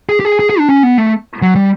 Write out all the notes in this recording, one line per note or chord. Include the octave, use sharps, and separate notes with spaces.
G#4
G4
G#4
G#4
G#4
D4
C#4
B3
A3
F#3
G3